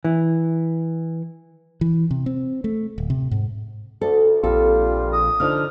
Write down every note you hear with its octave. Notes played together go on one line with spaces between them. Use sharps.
E3
E3
C3
C4
A3
D1
C3
G#2
D2 A4
A#1 G3 C4 F4 A4
D#6
D3 F3 D#4 F6